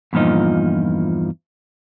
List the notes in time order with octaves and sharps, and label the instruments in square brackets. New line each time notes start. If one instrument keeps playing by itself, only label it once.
[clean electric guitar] E2 G2 A#2 F3 D#4